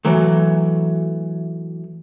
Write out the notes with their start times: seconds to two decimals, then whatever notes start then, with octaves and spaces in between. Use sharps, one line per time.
0.05 E3 F#3 A3